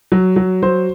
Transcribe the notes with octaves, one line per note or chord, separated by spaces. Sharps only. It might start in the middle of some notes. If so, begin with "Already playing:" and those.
F#3
F#3
F#3 C5